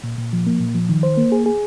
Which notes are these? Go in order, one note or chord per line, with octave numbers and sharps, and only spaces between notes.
A#2
A#2
F3
A#3
A#2
F3
D#3
C5
A#3
G#4
G#4